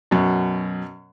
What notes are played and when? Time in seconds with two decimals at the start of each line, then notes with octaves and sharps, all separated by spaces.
0.11 F#2 B2